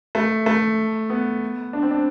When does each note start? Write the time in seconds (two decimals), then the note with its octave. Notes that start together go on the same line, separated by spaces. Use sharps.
0.15 A3
0.46 A3
1.10 B3
1.73 D4
1.82 C4
1.91 D4